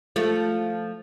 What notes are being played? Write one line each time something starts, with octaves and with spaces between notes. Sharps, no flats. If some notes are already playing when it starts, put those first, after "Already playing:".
F3 A3